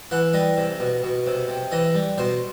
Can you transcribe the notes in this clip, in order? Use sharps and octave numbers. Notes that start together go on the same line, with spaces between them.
E3 F#5
G3 D#5
C3
B2
B2
C3
C3
E3 D#5
G3
B2 C5